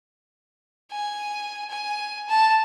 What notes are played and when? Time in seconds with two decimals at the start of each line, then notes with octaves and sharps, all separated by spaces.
0.91 G#5
1.70 G#5
2.28 A5